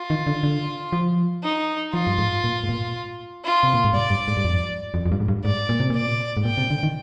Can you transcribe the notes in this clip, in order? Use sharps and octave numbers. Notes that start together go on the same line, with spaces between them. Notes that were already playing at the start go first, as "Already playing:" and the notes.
Already playing: F4
D#3
D3
D3
F3
D#4
F3 F4
G2
G#2
A#2
G#2
A#2
F4
C3
A#2
G#2
G2 D5
G2
G#2
G2
F2
F2
F2
G2
G#2
G2
G#2 D5
A#2
C3
A#2 D5
G#2
A#2 G5
C3
D3
D#3